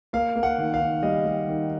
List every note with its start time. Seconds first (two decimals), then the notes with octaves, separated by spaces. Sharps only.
0.13 A#3 F5
0.36 A#3
0.43 F#5
0.58 D#3
0.74 F5
0.80 D#3
1.03 G3 D#5
1.25 G3
1.48 D#3